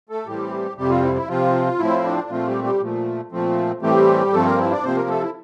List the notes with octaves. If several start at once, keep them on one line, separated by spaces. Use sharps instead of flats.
A3 A4
A2 E3 G3 C4 G4
F2 C3 G3 C4 G4
F3 F4
E4
E4
C3 F3 C4 F4
A2 F3 C4 E4
D4
A#2 F3 A3 C4 F4
G3 G4
G3 G4
A#2 F3 A3
A#2 F3 A3 C4
A2 E3 G3 A3 C4 G4
G2 F3 A3 C4 A4
A#3 A#4
E4
D4 D5
C3 F3 A#3 C4 C5
A#3 A#4
A3 A4
E4